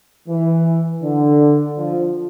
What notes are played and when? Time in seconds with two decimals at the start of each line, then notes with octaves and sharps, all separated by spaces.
0.28 E3
1.03 D3
1.77 F3